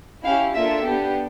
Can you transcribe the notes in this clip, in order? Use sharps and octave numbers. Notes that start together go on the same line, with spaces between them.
C#4 E4 G4 F5
A#3 D4 F4 A4 E5
B3 D4 G4